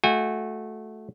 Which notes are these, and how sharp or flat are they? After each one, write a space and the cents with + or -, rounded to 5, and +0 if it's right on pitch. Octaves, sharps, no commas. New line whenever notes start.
A3 -15 F#4 -20 G#5 -45